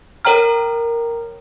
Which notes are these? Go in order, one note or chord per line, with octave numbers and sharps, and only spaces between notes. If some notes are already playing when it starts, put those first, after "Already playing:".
A#4 C#5 G5 A#5 F6